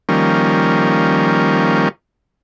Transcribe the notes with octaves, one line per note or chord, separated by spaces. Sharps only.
D#3 F3 G3 A#3 C#4